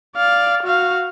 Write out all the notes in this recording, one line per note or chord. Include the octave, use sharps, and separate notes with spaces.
D5 F5
F#4 F5